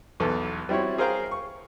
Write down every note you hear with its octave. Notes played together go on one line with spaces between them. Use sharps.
B1 E2 A4
G3 C4 E4 F#4 C#5
G#4 A#4 C5 F5 G5 A#5
C#6